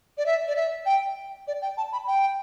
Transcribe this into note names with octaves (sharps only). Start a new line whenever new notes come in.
D5
E5
D5
E5
G5
D5
G5
A5
B5
G5